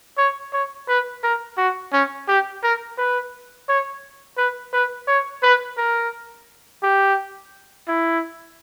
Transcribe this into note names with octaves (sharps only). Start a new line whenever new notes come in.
C#5
C#5
B4
A#4
F#4
C#4
G4
A#4
B4
C#5
B4
B4
C#5
B4
A#4
G4
E4